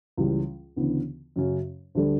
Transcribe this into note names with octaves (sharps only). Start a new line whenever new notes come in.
C#2 C#3 E3 G3
D2 C#3 E3 B3
F#2 C#3 F#3 C#4
D2 D3 G3 D4 A4